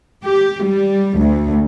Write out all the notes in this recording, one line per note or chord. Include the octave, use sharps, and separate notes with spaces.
G4
G3
D2